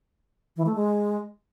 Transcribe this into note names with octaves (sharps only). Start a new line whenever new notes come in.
E3
A3
G#3